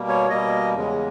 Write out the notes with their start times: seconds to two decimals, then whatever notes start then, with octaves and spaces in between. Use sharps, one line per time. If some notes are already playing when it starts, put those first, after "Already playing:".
Already playing: B2 G3 A#3
0.08 C#5
0.30 B2 G3 A#3 D#5
0.75 E2 C#3 G#3